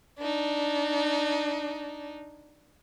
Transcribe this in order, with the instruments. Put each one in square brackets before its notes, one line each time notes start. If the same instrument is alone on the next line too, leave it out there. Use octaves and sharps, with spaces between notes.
[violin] D4 D#4